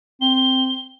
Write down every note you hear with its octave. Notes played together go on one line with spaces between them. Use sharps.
C4 G7